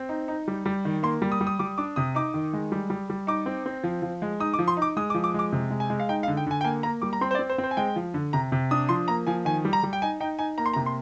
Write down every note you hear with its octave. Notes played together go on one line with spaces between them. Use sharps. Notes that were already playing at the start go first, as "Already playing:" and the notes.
Already playing: C4
D#4
D#4
G3
G3
D#3
A#3 C6
G3
D#6
G3
D#6
G3 D6
D4 D6
C3 D#6
D#4 D6
D#3
G#3
G3
G3
G3
D#4 D6
C4
C4
F3
F3
G#3
D#4 D#6
D6
F3
C6
D#4 D6
G#3 D#6
D6
F3
D6
G#3 D6
C3
G#3
G#5
G#3
F5
D#4 G5
F5
D3
G5
D3 G#5
G5
A#3 G#5
A#3 A#5
G3 D6
A#5
C4 C6
C5
D5
C4
C5
C4
C5
G#5
G#3 G5
F3
D3
C3 A#5
C3
D4 D#6
F3 C6
A#3 A#5
F3 G#5
D#3 G#5
G3
A#5
G3
G5
D#4 G#5
D#4 G5
D#4 G#5
A#3 A#5
C6
A#5
C3
C6